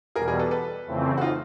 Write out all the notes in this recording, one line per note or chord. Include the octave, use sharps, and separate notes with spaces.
E2 B2 G3 G#4 A#4
G#4 A#4
A4 B4
A4 B4
F2 C#3 E3 A3 C4
F#4
D#4 F4